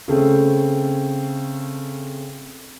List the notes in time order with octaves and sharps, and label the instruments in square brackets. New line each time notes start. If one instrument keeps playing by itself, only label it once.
[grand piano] C#3 A3 C4